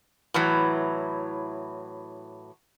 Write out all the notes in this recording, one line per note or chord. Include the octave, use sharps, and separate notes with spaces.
A2 E3 F#3